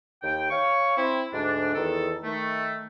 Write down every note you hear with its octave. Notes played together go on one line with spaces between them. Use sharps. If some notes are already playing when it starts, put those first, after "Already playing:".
D#2 G5
C#5 F5 C#6
C4 E4
D2 G#2 D4
E2 D#3 A4
D#3 A3